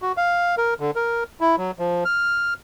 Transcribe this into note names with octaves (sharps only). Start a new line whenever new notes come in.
F#4
F5
A#4
D3
A#4
E4
F#3
F3
F6